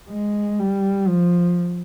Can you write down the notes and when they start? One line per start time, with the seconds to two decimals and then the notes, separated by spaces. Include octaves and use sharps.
0.10 G#3
0.59 G3
1.08 F3